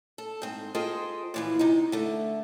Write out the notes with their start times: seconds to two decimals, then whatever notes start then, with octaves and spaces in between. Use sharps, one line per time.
0.18 A4
0.42 G#2 C4
0.75 F4 G#4 A4 C5 D#5 G5
1.34 A#2 E3 F3
1.59 C3 D#4
1.92 D3 A3